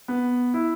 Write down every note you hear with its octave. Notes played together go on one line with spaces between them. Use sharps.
B3
E4